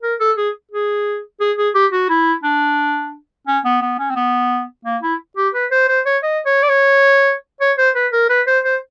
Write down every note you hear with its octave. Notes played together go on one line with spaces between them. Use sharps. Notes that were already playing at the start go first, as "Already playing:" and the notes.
A#4
A4
G#4
G#4
G#4
G#4
G4
F#4
E4
D4
C#4
B3
B3
C#4
C4
B3
A#3
E4
G4
B4
C5
C5
C#5
D#5
C#5
D5
C#5
C#5
C5
B4
A#4
B4
C5
C5